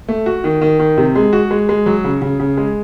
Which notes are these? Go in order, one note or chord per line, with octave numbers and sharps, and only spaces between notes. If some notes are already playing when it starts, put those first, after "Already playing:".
A3
F#4
D#3
D#3
D#3
C3
G#3
F#4
G#3
G#3
F#3
C#3
C#3
C#3
G#3